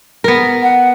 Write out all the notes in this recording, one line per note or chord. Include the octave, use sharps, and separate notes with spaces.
B3 A#4
F#5